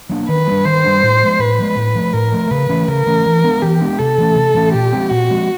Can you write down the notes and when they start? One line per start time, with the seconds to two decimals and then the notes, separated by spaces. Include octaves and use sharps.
0.09 F#3 A#3 D4
0.28 D#3 B4
0.47 G3 A#3 D4
0.65 D#3 C5
0.84 G3 A#3 D4
1.03 A2
1.22 F3 G#3
1.39 A2 B4
1.58 F3 G#3
1.76 A2
1.95 F3 A3
2.13 A2 A#4
2.32 F3 A3
2.51 C#3 B4
2.69 E3 A3 C#4
2.88 C#3 A#4
3.07 E3 A3 C#4
3.26 E3
3.43 G#3 B3 D4
3.62 E3 G4
3.81 G#3 B3 D4
3.99 C3 A4
4.18 E3 A3 C#4
4.36 C3
4.55 E3 A3 C#4
4.73 A#2 G4
4.93 F3 G#3 C4
5.10 A#2 F#4
5.29 F3 G#3 C4